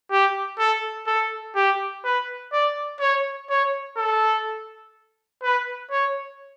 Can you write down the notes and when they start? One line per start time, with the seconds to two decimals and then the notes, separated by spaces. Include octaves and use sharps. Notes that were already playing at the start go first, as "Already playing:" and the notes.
0.11 G4
0.59 A4
1.07 A4
1.55 G4
2.04 B4
2.52 D5
3.00 C#5
3.49 C#5
3.97 A4
5.43 B4
5.91 C#5